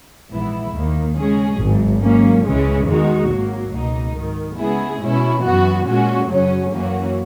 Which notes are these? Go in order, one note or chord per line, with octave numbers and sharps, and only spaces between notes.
A#1 G#2 E3 B3 E4
D#2 D#3 A#3
C#3 G#3 C#4 G#4
G#1 G#2 F#3
G#2 F#3 A#3 C#4
C#2 C#3 E3 G#3 C#4
E2 D#3 G#3 D#4 F#4
G#1 G#2 F#3 A#3
C#2 B2 A#3 D#4
G#2 D#3 F#3
C#3 G#3 B3 E4 G#4
B2 G#3 C#4 E4
F#2 E3 B3 F#4
A#2 G#3 C#4 F#4
F#2 C#3 F#3 C#4
F#2 E3 A#3 C#4 F#4